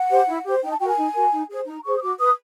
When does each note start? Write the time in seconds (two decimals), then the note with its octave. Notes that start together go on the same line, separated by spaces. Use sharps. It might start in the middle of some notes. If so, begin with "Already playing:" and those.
Already playing: F#5
0.10 G4 C5
0.27 E4
0.44 G4 C5
0.62 D#4 G5
0.71 A5
0.80 F#4 G5
0.83 A#4
0.88 G#5
0.97 D#4
1.14 F#4 A#4
1.31 D#4
1.50 G#4 C5
1.67 D#4 A#5
1.84 G#4 C5 C#6
1.97 D#6
2.01 F#4 D6
2.19 B4 D#6